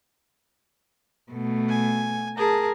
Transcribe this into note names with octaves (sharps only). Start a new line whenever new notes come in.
B2 A3
G#5
G#4 A#4 A5